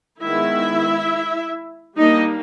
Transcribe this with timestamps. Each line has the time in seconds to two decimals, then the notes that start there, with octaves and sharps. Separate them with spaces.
0.21 D#3 G#3 B3 E4 E5
1.97 G3 A#3 D4 D#4 D#5